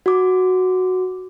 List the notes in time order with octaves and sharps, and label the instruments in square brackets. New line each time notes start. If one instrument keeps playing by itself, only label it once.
[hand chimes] F#4 D6